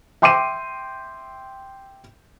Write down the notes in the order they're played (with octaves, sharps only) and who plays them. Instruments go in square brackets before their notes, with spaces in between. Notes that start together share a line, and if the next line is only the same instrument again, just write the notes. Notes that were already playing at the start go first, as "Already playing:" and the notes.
[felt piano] E5 G5 C6 D6 C7 D#7